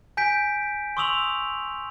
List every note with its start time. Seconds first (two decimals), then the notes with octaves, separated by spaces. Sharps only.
0.17 G#5 G6 B6 D7
0.97 C6 C#6 D#6 E6 F7 F#7